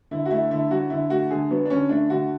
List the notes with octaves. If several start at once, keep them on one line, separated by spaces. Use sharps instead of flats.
D3 E4
F#4
A3 E4
D3 E4
F#3 F#4
D3 E4
A3 F#4
D3 G#4
F#3 B3
D4
D3 C#4
A3 D4
D3 F#4